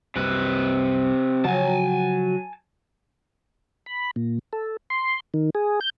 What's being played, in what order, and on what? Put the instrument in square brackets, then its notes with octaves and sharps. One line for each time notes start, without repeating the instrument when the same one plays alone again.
[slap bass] C2 F#2 [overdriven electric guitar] C3 B4
[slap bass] C#3 F3 [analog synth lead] F#3 [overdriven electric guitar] G#5 A5
[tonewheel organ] B5
A#2
A4
C6
D#3
G#4
G6